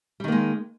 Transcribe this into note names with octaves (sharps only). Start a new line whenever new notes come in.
D#3 G3 G#3 A#3